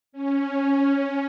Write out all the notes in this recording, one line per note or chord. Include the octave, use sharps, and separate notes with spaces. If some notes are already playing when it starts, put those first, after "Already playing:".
C#4